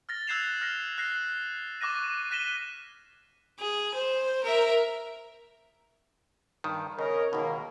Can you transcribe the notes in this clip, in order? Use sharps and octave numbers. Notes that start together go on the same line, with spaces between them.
F6 A6 A#6
E6 F#6 G#6 C7 E7 F7
F6 A#6 C7
F6 F#6 A#6 C7
C#6 D6 F#6 A#6 D#7
F#6 A#6 B6 D#7 E7 G7
G#4
C5
A#4 E5
G2 D#3
C#3 A#4 C#5 D#5
C#2 B2 D#3 A#3